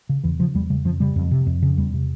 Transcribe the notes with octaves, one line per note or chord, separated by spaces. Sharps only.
C#3
E2 E3
C#3 F3
E2 G3
C#3 G3
F2 F3
C#3 G3
F2
C3
F2
C#3
E2 G3
C3